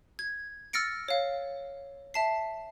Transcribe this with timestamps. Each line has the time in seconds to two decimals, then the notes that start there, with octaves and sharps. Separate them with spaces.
0.19 G#6
0.73 E6 F6 A6 A#6 C#7 D7
1.08 C#5 F5
2.14 E5 A5 C7